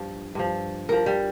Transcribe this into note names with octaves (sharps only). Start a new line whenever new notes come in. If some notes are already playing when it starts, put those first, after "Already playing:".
Already playing: G2 F3
G2 F3
G2 F3 A#4
G3